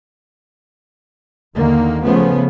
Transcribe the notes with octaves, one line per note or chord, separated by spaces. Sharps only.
D#2 D3 D#3 A#3
C#3 F3 A3 B3 C#4